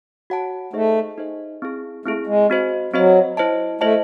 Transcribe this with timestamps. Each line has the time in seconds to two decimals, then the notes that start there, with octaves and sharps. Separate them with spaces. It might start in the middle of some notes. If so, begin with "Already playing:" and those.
0.30 F#4 C#5 F#5 A5
0.73 A3 D#4 G#4 C5 D#5
1.18 D#4 G#4 C5 D#5
1.62 C4 E4 G#4
2.06 A3 C4 E4 G#4
2.27 G#3
2.50 C4 F#4 C5 D#5
2.93 F#3 C4 F#4 C5 D#5
3.37 E4 C5 D#5 A5
3.81 A3 E4 C5 D#5 A5